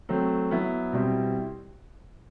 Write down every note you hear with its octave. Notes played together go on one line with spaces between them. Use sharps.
F#3 A3 C4
F#3 B3 E4
B2 G3 C4 E4